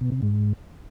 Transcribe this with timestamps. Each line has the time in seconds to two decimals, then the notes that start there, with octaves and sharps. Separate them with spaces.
0.01 B2
0.12 C3
0.22 G#2